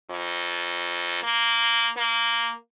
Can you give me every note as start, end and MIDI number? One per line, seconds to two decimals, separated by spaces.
0.10 1.21 41
1.23 1.89 58
1.97 2.53 58